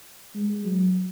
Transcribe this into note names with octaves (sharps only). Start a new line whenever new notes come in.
G#3
F#3